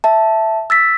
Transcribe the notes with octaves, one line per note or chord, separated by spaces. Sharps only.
E5 A5
E6 A6 B6